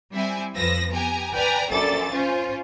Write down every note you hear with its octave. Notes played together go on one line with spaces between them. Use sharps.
G3 C4 E4 G#5
F2 F3 B4 E6 A#6
B3 G4 G#5 A#5
B4 D5 G5 G#5 A#5
A#1 F#2 A4 D5 A6
C#4 F4 C5